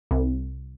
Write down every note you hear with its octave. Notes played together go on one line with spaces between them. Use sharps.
C2